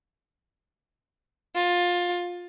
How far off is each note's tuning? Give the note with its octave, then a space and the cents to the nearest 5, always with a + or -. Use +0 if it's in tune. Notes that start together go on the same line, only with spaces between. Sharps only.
F4 +20